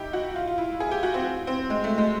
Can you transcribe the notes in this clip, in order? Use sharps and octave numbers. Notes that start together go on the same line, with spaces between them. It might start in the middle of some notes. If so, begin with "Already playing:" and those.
Already playing: D#4 E4 G4
F#4
F4
F4
E4
G#4
G4
F#4
C4
C4
G#3
A3
G#3